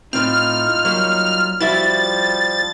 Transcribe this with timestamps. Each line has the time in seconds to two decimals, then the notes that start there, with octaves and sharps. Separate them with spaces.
0.13 A2 C4 D#4 F4 F6
0.85 F#3 G3 A#3 F6
1.61 F3 G3 E4 F#4 E5 A6